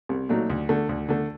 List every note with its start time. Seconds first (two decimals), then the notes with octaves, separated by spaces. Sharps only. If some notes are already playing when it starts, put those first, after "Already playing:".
0.09 C2
0.29 A#2 F#3 A3 D#4
0.50 D2
0.69 D3 A3
0.89 D2
1.09 D3 A3